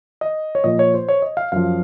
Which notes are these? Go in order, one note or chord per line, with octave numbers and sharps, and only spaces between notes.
D#5
C#5
A#2 F3 D#5
C#5
C5
C#5
D#5
F5
F#2 F3 F5